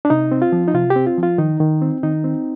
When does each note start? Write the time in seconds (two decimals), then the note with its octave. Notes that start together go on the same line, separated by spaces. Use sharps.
0.05 D4
0.10 C3 D#4
0.32 C4
0.42 F4
0.52 F3
0.68 D#4
0.74 C3 F4
0.90 G4
0.96 C4
1.07 F4
1.18 F3
1.23 F4
1.38 D#3 D#4
1.60 D#3
1.82 C4
2.03 D#3 D#4
2.24 C4